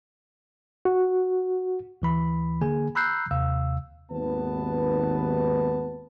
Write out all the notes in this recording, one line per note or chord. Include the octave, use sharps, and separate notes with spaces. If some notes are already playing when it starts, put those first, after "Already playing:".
F#4
D2 E3 B5
D3 A#3 G#4 G#5
A#5 B5 E6 F#6 G6 C7
D#2 C3 F5 E6
G#1 D#2 B3 B4 A5